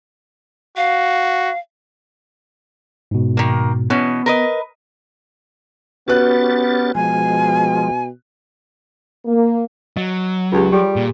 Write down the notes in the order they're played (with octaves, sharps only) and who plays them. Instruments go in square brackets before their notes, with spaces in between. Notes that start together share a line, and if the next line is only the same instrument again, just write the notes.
[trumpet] F#4 [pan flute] F5
[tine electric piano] G#2 B2
[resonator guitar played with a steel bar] D#3 A#3
[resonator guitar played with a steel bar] B2 E3 C#4 [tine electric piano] B3
[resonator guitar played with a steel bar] A#4 B4 D#5
[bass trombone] B3 [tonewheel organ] C#4 G4 A6 [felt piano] F#4 B4 F#6
[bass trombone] B2 [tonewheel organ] F3 G#3 [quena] G#5
[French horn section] A#3
[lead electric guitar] F#3 [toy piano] D#5
[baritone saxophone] C#2 [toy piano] F4 G4
[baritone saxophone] G3 [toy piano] G4 G#4 C6
[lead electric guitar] A#2